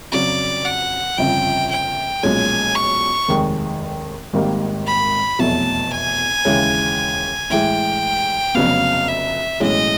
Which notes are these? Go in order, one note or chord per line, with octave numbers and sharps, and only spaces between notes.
F2 C#3 F#3 D5
F#5
G1 F2 C#3 F3 G5
G5
B1 A#2 F3 G#3 C#4 G#5
C#6
F1 D#2 D#3 G#3
G#1 G#2 D#3 G3 A#3
B5
F1 E2 B2 F#3 A3 A5
G#5
D#2 C#3 E3 G#3 C#4
A2 E3 G#3 G5
F1 F2 C#3 F#3 B3 F5
E5
B1 A2 E3 G#3 C#4 D#5